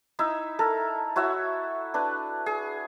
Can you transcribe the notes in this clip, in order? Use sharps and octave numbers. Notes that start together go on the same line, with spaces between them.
D#4 E4 E5
A4 A#4
E4 F#4 C#5 E5
D4 B4
G#4